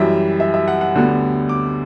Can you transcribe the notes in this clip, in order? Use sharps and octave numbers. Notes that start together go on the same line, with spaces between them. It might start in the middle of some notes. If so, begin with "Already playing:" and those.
Already playing: F#2 E3 G3 E5
E5
E5
F#5
F#5
D2 D3 G3 B3
D6